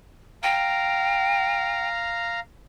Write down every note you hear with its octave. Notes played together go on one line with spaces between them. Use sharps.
F5 G5 A#5